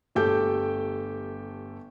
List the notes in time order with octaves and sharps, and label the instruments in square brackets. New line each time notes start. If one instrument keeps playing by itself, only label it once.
[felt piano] G1 A3 G4 A4 G5 G6